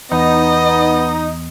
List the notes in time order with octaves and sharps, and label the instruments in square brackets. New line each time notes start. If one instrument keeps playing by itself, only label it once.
[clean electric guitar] E2 [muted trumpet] B3 [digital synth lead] D#4 [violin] D#5